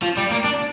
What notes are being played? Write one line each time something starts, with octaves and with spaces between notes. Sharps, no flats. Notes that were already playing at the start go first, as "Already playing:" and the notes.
F3
G3
A#3
D4